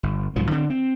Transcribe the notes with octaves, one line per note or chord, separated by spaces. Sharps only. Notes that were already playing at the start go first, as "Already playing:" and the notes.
G1
C2 G#2 F3 F#3
D3 C4
C4